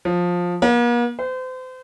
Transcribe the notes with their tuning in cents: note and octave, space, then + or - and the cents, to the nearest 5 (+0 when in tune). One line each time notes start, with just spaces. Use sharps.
F3 +15
A#3 +45
C5 -35